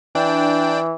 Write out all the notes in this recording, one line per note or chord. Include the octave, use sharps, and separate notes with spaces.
E3 D4 G5